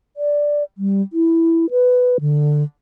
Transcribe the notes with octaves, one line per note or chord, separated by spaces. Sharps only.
D5
G3
E4
B4
D3